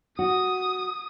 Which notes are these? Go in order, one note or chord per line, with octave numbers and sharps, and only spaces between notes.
F#4 D#6